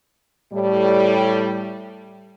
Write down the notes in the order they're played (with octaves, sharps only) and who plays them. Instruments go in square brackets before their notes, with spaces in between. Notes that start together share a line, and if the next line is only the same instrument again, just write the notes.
[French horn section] A2 G3